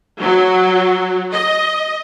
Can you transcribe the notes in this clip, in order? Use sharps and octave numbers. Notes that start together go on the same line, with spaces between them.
F#3
D#5